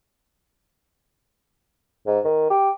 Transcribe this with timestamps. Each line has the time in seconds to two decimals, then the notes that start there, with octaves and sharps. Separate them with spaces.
2.07 G#2
2.24 D#3
2.50 G4